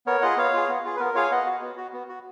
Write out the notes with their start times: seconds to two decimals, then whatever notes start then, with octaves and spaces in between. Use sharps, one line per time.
0.06 B3 A#4 C#5
0.22 F4 G#4 D#5 F#5
0.37 B3 C#5 F5
0.54 F4 G#4
0.69 B3
0.85 F4 G#4
0.97 B4
1.00 B3 A#4
1.15 F4 G#4 C#5 F5
1.23 G#5
1.31 B3 D#5 F#5
1.46 F#4
1.62 B3
1.77 F#4
1.93 B3
2.09 F#4